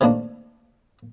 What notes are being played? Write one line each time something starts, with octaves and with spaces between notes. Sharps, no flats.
C3 D#3 A3 A#3 D4